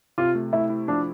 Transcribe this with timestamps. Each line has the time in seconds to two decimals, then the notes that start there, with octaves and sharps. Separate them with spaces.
0.18 C3 F4
0.35 A3
0.53 A3 E4
0.70 E4
0.88 F3 D4